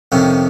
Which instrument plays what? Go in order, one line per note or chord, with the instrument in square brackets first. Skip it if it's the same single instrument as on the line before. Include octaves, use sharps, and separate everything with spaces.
[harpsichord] F2 C3 D#3 C#4